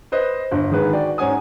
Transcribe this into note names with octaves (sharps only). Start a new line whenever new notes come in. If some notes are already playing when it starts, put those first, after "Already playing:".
B4 C5 D#5
G1
G#1 D3 D#3 G#3 G#4 B4
F#4 D5 G5
G#2 C#4 F#5 G#5 D#6